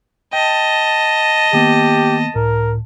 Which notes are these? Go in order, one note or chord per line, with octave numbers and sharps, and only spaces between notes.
D#5 G5 A5
D#3 A#3 B3 G4
C#2 A2 A#4